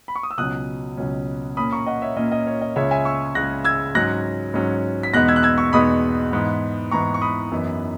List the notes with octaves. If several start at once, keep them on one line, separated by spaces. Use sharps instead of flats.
B5
C#6
D#6
E6
C#2 B2 F#3 C#4 D#6 F#6
C#2 B2 F#3 C#4
A#2 A#3 C#4 B5 D#6
A#5 C#6
D#5 F#5
C#5 E5
A#2 A#3 C#4 D#5
D#5
C#5
D#5
C#2 C#3 G#3 C#5 E5
E5 G#5
C#6 E6
C#2 C#3 G#3 F#6 A#6
E6 G#6
G#2 F#3 C#4 F#6 A#6
G#2 F#3 C#4
B6
E2 B2 G#3 B3 D#4 F#6 A#6
E6 G#6
F#6
E6 G#6
C#6 E6
E2 B2 G#3 B3 D#4 B5 D#6
G#2 E3 B3
G#2 E3 B3 A#5 C#6
C#6
B5 D#6
F#2 E3 B3 D#4